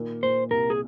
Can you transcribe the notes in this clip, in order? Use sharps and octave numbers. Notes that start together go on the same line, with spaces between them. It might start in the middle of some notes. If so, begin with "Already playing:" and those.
Already playing: A#2 D#3 A#3
A#2 C5
C2 A#4
G#4